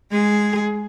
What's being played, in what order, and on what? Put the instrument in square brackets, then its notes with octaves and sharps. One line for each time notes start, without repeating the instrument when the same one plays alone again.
[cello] G#3 G#4